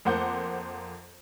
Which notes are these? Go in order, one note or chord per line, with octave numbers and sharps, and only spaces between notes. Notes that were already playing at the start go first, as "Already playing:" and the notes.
F2 A#3 C5 F#5 D6 G6